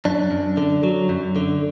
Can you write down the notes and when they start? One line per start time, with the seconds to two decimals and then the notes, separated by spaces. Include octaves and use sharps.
0.05 F#2 D4
0.31 F#2
0.57 D3
0.83 F#3
1.09 F#2
1.36 D3